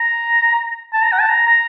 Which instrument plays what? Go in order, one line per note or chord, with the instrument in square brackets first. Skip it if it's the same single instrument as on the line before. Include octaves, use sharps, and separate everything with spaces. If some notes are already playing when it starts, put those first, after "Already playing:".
Already playing: [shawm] A#5
A5
A#5
F#5
A5
A#5
A#5